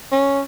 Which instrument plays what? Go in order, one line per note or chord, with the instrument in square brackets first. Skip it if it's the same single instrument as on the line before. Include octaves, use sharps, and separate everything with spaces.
[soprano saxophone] C#4